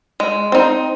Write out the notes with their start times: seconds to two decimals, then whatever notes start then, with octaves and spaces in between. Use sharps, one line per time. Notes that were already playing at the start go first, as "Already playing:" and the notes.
0.20 G#3
0.52 C4 D#4